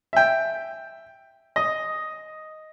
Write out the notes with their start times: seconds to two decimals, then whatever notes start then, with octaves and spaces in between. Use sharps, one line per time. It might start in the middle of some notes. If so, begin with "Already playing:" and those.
0.13 E5 G5
1.56 D#5